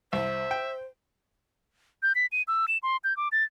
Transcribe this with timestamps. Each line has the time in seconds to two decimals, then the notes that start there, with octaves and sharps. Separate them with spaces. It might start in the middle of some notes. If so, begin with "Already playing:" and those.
0.13 C2 C5 E5
0.51 G5
2.03 G6
2.15 B6
2.32 D#7
2.48 E6
2.68 E7
2.83 C6
3.04 G6
3.17 D6
3.32 A6